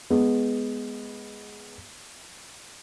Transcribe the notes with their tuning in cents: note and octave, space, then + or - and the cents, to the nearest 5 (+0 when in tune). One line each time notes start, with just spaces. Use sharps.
G#3 +0 B3 +0